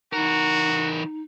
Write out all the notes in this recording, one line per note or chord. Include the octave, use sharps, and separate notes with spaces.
E3 D#4 F#4 A#4